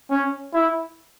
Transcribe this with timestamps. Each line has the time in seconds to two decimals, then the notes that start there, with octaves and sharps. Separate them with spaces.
0.11 C#4
0.53 E4